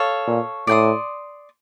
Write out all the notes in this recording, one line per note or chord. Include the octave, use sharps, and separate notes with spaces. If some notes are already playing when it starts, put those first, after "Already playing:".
Already playing: A4 C#5 F5
A#2
A2 D5 G5 C6 D#6